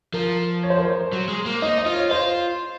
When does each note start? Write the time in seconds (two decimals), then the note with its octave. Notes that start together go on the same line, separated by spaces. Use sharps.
0.13 F3 A#4
0.63 C#5
0.70 C5
0.78 A#4
0.85 C5
1.12 F#3
1.28 G#3
1.46 A#3
1.62 D#4 D#5
1.78 D#5
1.86 F4
1.95 C#5
2.11 F4 C5